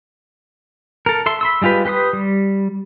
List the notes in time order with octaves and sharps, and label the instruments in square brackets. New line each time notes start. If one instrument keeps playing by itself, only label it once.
[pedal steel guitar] A4 A#4
A4 E5 C6
B5 C6 E6
G3 G#3 F4 G4 B4
G4 B4 C6 D#6
G3